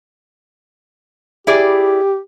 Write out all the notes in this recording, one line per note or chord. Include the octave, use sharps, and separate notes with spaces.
E4 G4 G#4 D5